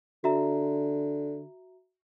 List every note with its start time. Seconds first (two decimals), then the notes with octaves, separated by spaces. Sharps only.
0.24 D3 F#4 E5 A#5